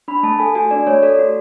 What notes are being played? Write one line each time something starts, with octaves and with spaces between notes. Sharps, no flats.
D4 B5
A3 A5
A4 G#5
F#4 G#5
D4 D5
A3 C#5
A4 D5
F#4